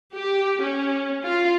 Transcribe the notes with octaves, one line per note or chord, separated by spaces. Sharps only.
G4
C#4
F4